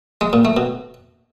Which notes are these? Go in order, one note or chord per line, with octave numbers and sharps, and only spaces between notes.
G#3
A#2
A3
B2